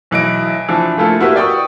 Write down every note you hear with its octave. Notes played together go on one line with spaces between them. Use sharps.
B1 E3 D#5 D7
E3 F3 D4
F3 A3 A#3 E4 F4 A4
A#3 E4 F#4 G4 B4
D5 G5 C#6 D#6